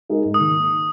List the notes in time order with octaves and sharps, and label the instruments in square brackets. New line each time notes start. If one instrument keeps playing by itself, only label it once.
[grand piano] G#3 D#4 A#4
G#2
[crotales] D#6
[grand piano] D#3 A#3